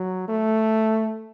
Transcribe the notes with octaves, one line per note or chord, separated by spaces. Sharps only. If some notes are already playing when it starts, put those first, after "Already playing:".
Already playing: F#3
A3